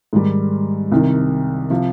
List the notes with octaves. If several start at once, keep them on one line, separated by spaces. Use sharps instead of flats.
G#2 D#3 G3
C2 C3 D#3
C3 F3